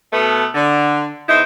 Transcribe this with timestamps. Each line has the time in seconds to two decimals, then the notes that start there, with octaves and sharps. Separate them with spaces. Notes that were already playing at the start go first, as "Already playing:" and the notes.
0.12 B2 A3 B3
0.55 D3
1.29 E2 D#4 E4 C5